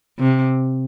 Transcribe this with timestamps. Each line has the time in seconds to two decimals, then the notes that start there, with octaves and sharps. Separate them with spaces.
0.19 C3